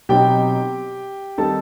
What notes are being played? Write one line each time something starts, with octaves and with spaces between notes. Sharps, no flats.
B2 F#3 C4 D#4 G4 G5
D#3 G3 C4 D#4 A4 A5